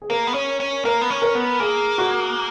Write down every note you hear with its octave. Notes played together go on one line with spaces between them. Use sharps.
G#4
A#3 A#4
B3
C#4
C#4
A#3 A#4
B3
C#4
A#4
B3
A#3 G#4
F#4